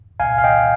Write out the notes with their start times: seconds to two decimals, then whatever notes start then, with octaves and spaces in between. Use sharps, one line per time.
0.20 C2 A#2 F5 G#5
0.38 F5
0.44 D#5 G5